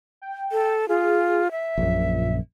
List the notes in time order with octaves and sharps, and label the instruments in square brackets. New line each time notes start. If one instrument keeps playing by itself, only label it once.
[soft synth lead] G5
[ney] A4
[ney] F4 [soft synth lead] G#4
[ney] E5
[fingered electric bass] A#1 F#2 [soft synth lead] A#2